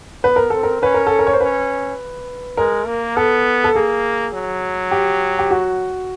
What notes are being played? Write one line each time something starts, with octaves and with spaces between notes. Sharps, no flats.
B3 B4
A#4
C4 A4
A#4
C#4 B4
A#4
A4
A#4
C#5
C5
C#4 B4
G#3 A#4
A#3
B3 A4
A4
A#3 G#4
F#3
G4
G4
F#4